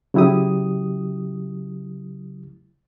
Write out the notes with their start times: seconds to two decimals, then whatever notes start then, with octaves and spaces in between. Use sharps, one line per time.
0.14 C#3 F#3 E4 G4 D#6